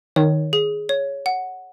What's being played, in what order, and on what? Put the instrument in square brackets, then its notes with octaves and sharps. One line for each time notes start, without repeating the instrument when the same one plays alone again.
[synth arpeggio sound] D#3 [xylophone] C#5
[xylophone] G#4
C#5
F#5